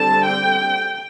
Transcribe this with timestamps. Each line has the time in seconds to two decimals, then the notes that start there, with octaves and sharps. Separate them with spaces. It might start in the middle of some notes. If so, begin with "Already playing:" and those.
Already playing: D3 G3 C4 A5
0.26 G5